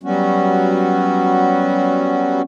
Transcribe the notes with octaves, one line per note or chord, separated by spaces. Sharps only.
F#3 G3 B3 C#4 F#4